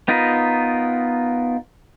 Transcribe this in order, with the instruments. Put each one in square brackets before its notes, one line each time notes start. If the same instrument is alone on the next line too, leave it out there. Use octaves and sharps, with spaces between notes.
[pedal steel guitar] B3 D#4 F4 A#4 B4